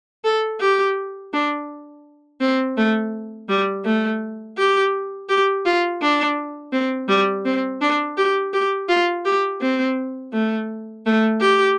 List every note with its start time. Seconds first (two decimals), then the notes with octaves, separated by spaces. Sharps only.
0.24 A4
0.61 G4
1.33 D4
2.41 C4
2.77 A3
3.49 G3
3.85 A3
4.58 G4
5.29 G4
5.65 F4
6.02 D4
6.73 C4
7.09 G3
7.45 C4
7.81 D4
8.17 G4
8.53 G4
8.89 F4
9.25 G4
9.61 C4
10.33 A3
11.06 A3
11.41 G4